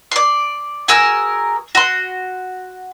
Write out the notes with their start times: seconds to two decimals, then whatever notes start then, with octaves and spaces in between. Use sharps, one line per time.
0.11 D5 C6
0.88 F#4 G#4 A#4 E6
1.75 F#4 C6